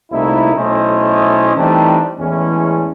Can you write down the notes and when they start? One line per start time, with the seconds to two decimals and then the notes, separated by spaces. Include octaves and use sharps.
0.12 C2 A#2 A3 D#4 E4
0.55 B1 A3 C#4 E4 C5 D#5
1.57 E3 G3 A3 C4 D4 D#4
2.20 E2 A2 E3 G#3 C#4